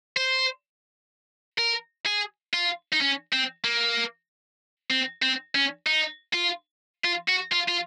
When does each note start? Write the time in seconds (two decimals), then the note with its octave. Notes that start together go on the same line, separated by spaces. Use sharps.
0.17 C5
1.59 A#4
2.06 G#4
2.54 F4
2.93 D#4
3.01 C#4
3.33 C4
3.64 A#3
4.91 C4
5.22 C4
5.55 C#4
5.87 D#4
6.33 F4
7.05 F4
7.29 F#4
7.53 F4
7.69 F4